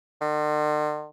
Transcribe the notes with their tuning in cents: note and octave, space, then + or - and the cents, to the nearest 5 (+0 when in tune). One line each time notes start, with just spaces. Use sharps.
D3 +45